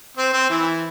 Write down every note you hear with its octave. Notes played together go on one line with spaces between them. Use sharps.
C4 C5
C4 C5
E3 E4